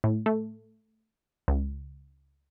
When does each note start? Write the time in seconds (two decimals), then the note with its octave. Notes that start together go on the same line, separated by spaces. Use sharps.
0.04 A2
0.26 A3
1.48 C#2